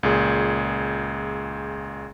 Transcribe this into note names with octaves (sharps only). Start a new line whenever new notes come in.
C#2 A#2 G#4